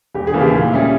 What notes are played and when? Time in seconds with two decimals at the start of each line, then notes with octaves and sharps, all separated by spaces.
0.14 E1 G4
0.27 G#4
0.34 D#2 C#3 E3 A#3
0.40 G4
0.53 A#2
0.72 G3 C#4 E4